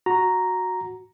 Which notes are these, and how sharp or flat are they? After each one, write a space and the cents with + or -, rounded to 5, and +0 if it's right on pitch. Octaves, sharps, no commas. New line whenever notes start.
F#4 -10 A#5 +0